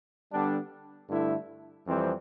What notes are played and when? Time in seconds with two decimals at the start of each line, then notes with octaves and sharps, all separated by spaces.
0.32 D3 G3 B3 D4
1.09 G2 D3 A3 E4
1.86 F2 E3 G3 C4